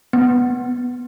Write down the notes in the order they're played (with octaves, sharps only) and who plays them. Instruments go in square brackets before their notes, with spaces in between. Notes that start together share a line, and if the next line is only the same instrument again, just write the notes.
[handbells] B3